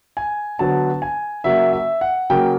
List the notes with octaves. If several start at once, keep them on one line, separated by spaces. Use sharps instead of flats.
G#5
D3 F#3 B3 A5
G#5
C#3 F#3 A#3 E5
E5
F#5
C#3 F#3 A#3 G5